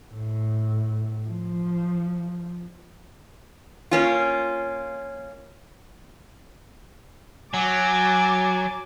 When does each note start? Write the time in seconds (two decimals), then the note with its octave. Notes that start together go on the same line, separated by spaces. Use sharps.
0.12 A2
1.29 F3
3.91 A#3 C#4 F4
7.54 F#3 G#5 D6 A6